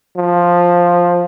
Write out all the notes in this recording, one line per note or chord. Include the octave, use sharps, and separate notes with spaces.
F3